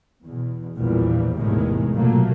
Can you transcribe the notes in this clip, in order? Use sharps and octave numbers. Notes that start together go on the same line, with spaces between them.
E2 B2
A#1 E2 A#2 E3 G3
G#1 E2 A2 C3 D#3 G#3
F1 B2 F#3 A3 A#3